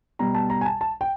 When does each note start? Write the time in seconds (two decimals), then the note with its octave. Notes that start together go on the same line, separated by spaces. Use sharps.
0.19 B2 G3 A#5
0.35 A5
0.50 A#5
0.61 G#5
0.66 A5
0.81 A5
1.01 G5